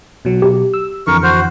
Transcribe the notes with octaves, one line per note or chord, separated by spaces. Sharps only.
B2 F#3
G4
E6
F2 D3 E3 A#4 C#6
F#4 C5